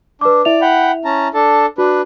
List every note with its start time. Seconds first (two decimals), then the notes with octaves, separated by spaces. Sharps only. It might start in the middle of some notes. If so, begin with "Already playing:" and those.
0.21 D4 B4 D6
0.45 E4 D5 E5 F7
0.61 F#5 G5 B5
1.05 C#4 A5 A#5
1.34 D4 A4 A5
1.78 D4 F#4 B4